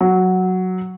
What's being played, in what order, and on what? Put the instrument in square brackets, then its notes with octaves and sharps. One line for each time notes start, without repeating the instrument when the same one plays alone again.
[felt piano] F#3